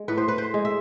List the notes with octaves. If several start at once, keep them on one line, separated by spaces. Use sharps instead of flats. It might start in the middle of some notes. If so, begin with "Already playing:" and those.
Already playing: G#3
A2 B4
C5
B4
C5
G#3
E5